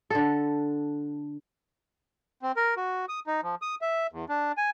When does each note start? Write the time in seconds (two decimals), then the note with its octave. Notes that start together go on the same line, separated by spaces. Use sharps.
0.10 D3 A4
2.43 C4
2.57 A#4
2.77 F#4
3.09 D#6
3.27 D#4
3.43 F3
3.62 D#6
3.82 E5
4.12 E2
4.29 D4
4.58 G#5